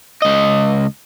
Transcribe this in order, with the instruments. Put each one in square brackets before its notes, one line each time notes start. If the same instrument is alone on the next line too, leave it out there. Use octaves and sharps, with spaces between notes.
[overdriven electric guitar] C#2 D#5